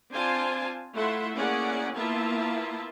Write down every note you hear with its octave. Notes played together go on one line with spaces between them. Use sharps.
C4 D4 F4 C5 G#5 A5
A3 E4 F4 E5 F#5 C6
A#3 C#4 E4 G#4 D5 F#5
A#3 B3 E4 F4 E5 A5